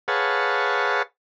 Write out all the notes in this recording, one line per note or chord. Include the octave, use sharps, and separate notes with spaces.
G#4 B4 C#5 F5 F#5 A5